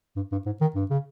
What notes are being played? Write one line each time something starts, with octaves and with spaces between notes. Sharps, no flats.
G2
G2
G#2
D#3
G2
C#3